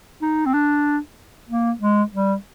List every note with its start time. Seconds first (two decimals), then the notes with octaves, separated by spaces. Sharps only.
0.22 D#4
0.46 C4
0.54 D4
1.49 A#3
1.81 G#3
2.12 G3